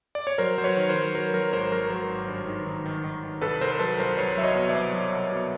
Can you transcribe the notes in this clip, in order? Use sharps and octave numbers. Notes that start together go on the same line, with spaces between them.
D5
C#5
F#3 A#4 C5
F#3 C5
B4 C#5
D#3
A#4 C5
F#3
F#3 A#4
F#3 A#4
G#1 A#4 C5
F#3 A#4
F#3 A#4
G#1
G2
D#3
D#3
D#3
D#3
D#3
C2 A4 B4
C2 A#4 C5
C5
F#3 A4 B4
C2 A#4 C5
C2 B4 C#5
F#3 E5
C#5 D#5
B2
D5 E5
C2
F#3
C2
B2